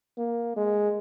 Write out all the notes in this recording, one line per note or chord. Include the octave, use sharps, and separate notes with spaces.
A#3
G#3